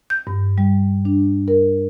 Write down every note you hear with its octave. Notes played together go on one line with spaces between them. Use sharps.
G6
G2
G3
D4
A#4